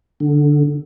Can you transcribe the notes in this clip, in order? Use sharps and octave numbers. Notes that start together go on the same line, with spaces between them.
D3